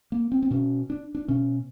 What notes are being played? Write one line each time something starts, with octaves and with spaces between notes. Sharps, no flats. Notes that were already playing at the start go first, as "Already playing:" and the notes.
A#3
C4
C4
B2 C#4
D4
D4
B2 C#4